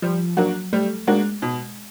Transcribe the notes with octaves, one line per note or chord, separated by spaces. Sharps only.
F3 G3
F#3 A#3 D4 F#4
G3 A3
G#3 A#3 D4 F#4
B2